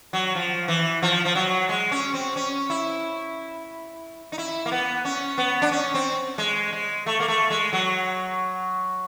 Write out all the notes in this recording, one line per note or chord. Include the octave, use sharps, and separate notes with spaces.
F#3
F3
E3
F3
F3
F#3
G#3
C#4
C4
C#4
E4
D#4
E4
A#3
B3
C#4
B3
D4
C#4
C4
G#3
G#3
A3
A#3
A3
G#3
F#3